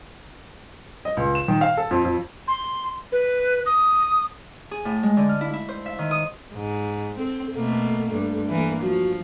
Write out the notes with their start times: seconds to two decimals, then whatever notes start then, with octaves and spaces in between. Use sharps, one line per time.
1.05 D#5
1.17 C#2
1.35 E7
1.48 D#3
1.61 F5
1.77 A4
1.91 F2
2.04 F2
2.48 C6
3.12 B4
3.66 D#6
4.71 G#4
4.85 A2
5.03 G#3
5.17 D3
5.29 F6
5.41 E4
5.53 E4
5.69 C5
5.86 E5
5.99 D#3
6.11 D#6
6.54 G#2
7.18 C4 A4
7.55 B2 A3 A#3 A4
8.12 G2
8.48 E3 A#3
8.82 F3 F#4